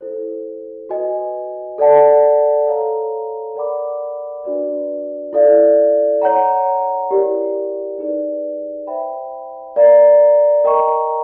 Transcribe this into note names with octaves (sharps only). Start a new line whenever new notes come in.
E4 A4 C5
F#4 B4 D#5 G#5
A4 D5 F#5 A5
A4 C#5 F5 A#5
A#4 D5 F#5 B5 D6
D4 F#4 B4 D5
E4 A4 D5 F5
C#5 F#5 A#5
E4 G4 A#4 D5
D#4 G#4 B4 D5
C5 E5 G5 B5
A#4 D5 F5 A#5
A#4 D#5 G5 A#5 C#6